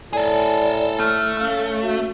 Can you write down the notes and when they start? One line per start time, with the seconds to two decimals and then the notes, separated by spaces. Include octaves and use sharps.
0.13 A2 G#4 A4 D5
0.99 A3 F6
1.39 C#4 F5
1.82 F#4